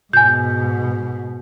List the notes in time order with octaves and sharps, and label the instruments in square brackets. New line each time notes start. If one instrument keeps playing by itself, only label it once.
[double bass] G#2 B2 [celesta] G#5 G6